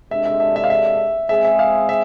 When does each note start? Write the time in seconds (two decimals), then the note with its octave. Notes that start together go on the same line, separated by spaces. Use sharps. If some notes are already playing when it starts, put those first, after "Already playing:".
0.11 C3 G#3 D4 A4 E5
0.25 E5
0.40 E5
0.56 E5
0.64 F5
0.70 E5
1.29 G#3 C4 G#4 E5
1.45 E5
1.59 F5
1.89 E5